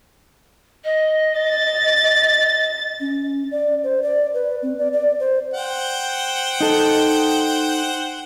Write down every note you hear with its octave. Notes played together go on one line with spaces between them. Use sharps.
D#5
A6
C#4
D5
C5
D5
B4
C4
D5
D5
C5
C5 F#5 G5
D#4 A4